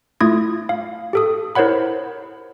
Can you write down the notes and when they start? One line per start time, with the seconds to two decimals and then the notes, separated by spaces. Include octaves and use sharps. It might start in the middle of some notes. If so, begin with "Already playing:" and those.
0.20 A3 E4 F4 D#6 G#6
0.69 F5
1.13 G4 A4 D#6
1.55 E4 A#4 C5 C#5 F#5 B5